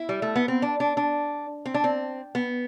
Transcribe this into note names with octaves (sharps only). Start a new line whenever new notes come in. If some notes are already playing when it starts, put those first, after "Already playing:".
Already playing: E4
G3
A3
B3
C4
D4
D4
D4
C4
D4
C4
B3